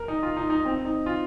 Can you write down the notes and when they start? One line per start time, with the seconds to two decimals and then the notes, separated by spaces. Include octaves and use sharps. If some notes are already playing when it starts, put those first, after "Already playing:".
Already playing: A#4
0.08 D#4
0.23 F4
0.37 D#4
0.50 D#4
0.65 C4
0.85 D#4
1.06 F4